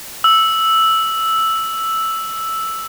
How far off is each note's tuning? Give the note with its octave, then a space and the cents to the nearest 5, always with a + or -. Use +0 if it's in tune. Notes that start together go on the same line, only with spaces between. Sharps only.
E6 +0